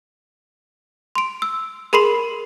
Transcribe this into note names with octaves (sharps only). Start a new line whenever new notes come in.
C6 D7
E6
G#4 A#4 B5 C6 C7 F#7